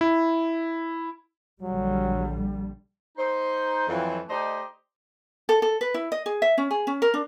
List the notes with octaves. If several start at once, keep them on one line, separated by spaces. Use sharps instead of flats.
E4
A#1 D3 F#3 G3
D#4 C5
F2 E3 F#3
A3 D#4 G4 C5 D5 D#5
A4
A4
B4
E4
D#5
G#4
E5
C#4
G#4
C#4
A#4
D4